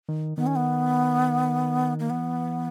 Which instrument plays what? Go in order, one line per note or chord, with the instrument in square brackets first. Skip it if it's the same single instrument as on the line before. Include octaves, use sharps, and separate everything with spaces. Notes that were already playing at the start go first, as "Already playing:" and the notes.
[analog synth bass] D#3
[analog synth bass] D#3 [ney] B3
[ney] C#4
B3
A#3
[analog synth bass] E3 [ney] B3